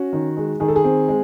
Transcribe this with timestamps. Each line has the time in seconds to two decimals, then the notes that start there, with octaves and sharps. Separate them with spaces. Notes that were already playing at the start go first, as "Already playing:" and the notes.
Already playing: C#4 F#4
0.13 D#3
0.37 G#3
0.60 D#3 G#4
0.68 A4
0.76 G#4
0.84 C4
1.08 G#3